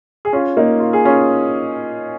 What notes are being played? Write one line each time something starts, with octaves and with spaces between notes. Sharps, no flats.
G#4
C#4 F4
A#3 D#4
F4
G#4
C#4 F4